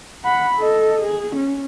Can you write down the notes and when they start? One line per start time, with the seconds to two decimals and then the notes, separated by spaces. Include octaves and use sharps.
0.24 F#5 B5
0.57 A4 D#5
1.02 G#4
1.36 C#4